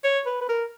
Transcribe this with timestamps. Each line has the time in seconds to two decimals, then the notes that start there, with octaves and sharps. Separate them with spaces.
0.04 C#5
0.26 B4
0.41 B4
0.49 A#4